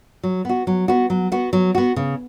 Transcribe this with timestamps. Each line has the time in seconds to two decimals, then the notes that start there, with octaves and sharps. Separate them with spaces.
0.23 F#3
0.45 B3 F#4
0.67 F#3
0.88 B3 F#4
1.10 F#3
1.32 B3 F#4
1.53 F#3
1.75 B3 F#4
1.96 C#3